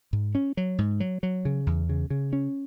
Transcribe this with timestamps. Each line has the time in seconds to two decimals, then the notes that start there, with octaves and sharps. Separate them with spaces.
0.13 G#2
0.35 C#4
0.57 F#3
0.78 G#2
1.00 F#3
1.23 F#3
1.45 C#3
1.67 E2
1.89 C#3
2.10 C#3
2.33 C#4